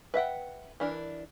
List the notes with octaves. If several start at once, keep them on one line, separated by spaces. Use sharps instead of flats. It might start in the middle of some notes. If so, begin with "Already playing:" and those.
B4 E5 F#5 G5
E3 D4 A#4